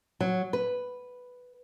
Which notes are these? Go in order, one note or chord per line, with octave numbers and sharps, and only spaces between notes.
F#3
B4